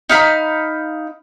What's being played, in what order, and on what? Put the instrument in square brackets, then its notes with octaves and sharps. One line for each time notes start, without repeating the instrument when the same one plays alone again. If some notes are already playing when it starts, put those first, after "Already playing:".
[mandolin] D#4 F5 B5